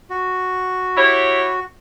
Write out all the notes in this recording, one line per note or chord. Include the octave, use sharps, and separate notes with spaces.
F#4
E4 G4 C#5